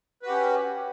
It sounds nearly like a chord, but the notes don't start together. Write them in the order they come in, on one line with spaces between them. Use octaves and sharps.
B4 F#4 G4 C#4